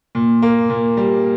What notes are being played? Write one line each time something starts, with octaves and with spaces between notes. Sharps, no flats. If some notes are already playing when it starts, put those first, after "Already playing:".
A#2
A#3
A#2
G3